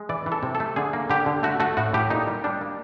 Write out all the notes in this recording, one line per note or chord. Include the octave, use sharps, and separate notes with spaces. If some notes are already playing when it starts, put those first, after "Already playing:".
Already playing: G#3
E3 D5
E3
A4
C3
A4
A3
D3 G#4
A#3
D3 G4
D3
A3 F#4
A3 F#4
A2 F#4
A2 G4
A#2 D#4
G3
G3 D4
A#3